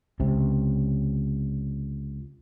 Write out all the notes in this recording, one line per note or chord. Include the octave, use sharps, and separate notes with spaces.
C#2 C3